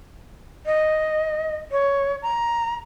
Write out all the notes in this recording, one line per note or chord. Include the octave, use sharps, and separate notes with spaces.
D#5
C#5
A#5